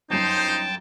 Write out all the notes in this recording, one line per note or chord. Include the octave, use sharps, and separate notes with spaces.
G1 F#2 D#4 C5 G5 A5